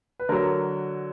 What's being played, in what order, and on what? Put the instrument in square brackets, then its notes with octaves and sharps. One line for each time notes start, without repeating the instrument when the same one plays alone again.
[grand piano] B4
D3 F#3 A#4